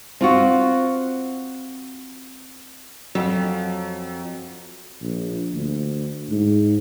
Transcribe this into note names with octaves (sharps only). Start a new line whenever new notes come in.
C4 F4 F#4
F2 F#3
A#1
D2
G#2